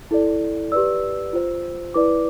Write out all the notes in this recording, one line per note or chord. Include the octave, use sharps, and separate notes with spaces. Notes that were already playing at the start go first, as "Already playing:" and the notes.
E4 A4 D5
G4 B4 D5 E6
F4 C5
E4 B4 D5 D6